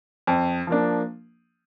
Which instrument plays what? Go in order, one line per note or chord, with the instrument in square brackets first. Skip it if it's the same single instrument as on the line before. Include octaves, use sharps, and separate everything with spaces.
[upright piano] F2
F3 A#3 D4